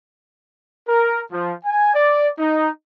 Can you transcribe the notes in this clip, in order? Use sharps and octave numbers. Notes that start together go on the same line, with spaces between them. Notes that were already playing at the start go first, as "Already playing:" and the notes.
A#4
F3
G#5
D5
D#4